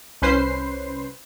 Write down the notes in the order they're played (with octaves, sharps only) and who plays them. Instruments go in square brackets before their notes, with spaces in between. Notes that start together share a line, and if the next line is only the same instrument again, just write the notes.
[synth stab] C2 C#4 B4 C5 C7